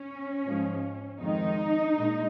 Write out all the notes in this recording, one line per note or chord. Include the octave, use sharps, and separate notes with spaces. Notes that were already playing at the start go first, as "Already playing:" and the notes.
Already playing: C#4
G#2 F3 G#3
F2 D#3 G#3 D#4
A#2 G#3